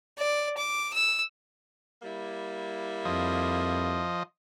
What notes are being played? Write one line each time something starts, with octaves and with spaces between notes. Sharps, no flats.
D5
D6
E6
G3 A#3 E4
F2 F3 D#5